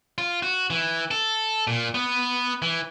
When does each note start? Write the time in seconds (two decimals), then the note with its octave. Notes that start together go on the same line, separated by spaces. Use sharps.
0.18 F4
0.42 F#4
0.70 E3
1.11 A4
1.67 A#2
1.94 B3
2.62 E3